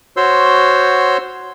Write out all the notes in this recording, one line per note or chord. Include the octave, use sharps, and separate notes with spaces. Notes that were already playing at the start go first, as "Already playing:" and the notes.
F#4 C5 C#5 C6 E6